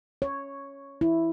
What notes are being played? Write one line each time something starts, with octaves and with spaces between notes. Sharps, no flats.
C#5
E4